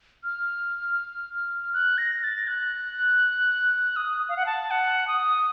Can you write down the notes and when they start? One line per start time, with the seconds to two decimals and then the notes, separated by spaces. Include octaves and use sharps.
0.24 F6
1.73 F#6
1.98 A#6
2.23 A6
2.48 F#6
3.96 D#6
4.29 F5
4.37 F#5
4.46 A5
4.71 F#5
5.08 D#6